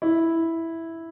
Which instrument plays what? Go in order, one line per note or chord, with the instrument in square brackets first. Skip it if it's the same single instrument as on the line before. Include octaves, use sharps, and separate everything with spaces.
[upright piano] E4